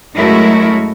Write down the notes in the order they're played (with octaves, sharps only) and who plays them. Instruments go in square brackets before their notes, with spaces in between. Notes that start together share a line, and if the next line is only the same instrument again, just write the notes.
[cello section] F#2 G#3 A3 E4 F#4 A#4